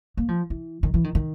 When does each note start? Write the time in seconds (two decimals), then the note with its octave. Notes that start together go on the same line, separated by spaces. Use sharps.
0.17 A#3
0.28 F3
0.50 E3
0.83 D#3
0.94 E3
1.04 D#3
1.15 D#3